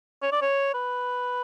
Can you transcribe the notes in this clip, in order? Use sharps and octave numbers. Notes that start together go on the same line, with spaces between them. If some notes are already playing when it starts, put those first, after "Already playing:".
C#5
D5
C#5
B4